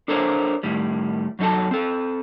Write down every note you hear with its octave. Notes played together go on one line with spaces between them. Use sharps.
D4 A4 A#4 C5 C#5
A2 D#3 G3
F#2 F#3 D#4 A4 A5
C4 A4